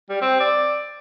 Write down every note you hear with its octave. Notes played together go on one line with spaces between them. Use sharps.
G3
C4
D5